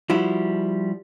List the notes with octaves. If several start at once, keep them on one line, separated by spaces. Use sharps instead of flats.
F3 G3 E4 F#4